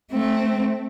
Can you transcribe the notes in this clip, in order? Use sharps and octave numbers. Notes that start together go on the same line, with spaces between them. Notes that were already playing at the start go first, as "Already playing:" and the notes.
A3 C4